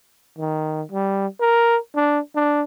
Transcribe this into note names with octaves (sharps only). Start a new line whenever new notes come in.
D#3
G3
A#4
D4
D4